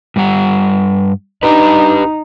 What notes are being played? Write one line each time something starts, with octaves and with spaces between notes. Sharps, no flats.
G2 G3 F#5
D4 D#4 G4 B4